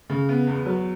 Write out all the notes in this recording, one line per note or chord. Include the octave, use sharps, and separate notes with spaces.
C#3
B3
E2
F#3